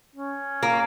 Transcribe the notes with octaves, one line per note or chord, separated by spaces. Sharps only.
C#4
A#3